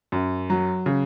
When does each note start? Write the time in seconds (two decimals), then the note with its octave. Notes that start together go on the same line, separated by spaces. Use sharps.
0.12 F#2
0.50 F#3
0.86 C#3